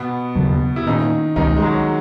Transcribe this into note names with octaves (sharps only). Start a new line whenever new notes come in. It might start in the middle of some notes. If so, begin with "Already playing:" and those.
Already playing: B2 B3
D#2 C#3 F#3 B3
E4
A#2 D#3 A#3 C#4 D#4
C#2 B2 D#3 G#3 C#4 D#4
G#3
F#3